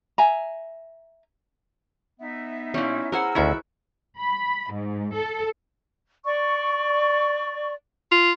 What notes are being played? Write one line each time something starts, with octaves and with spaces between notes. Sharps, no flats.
E5 G#5 A#5
B3 D#4 E5
A#2 F3 G3 C#4 E4
B3 G#4 A#4 C5 F#5 G#5 E6
D2 D#3 C#4 E4 F#4
B5
G#2
A4
D5 C#6
F4